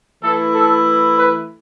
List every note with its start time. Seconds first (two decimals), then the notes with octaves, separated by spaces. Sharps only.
0.23 E3 A3 E4 A4
0.55 A4
1.19 B4